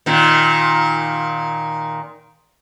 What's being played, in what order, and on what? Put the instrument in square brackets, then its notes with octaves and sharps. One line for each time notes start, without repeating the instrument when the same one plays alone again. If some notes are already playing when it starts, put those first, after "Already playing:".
[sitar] A#2 D#3